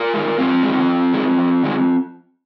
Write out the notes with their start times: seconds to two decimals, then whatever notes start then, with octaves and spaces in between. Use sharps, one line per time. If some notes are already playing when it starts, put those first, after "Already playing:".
Already playing: F4 A#4
0.13 D#3 G#3
0.38 G#2 C4 F4
0.63 D#3 G#3
0.88 F2
1.13 D#3 G#3
1.38 F2
1.63 D#3 G#3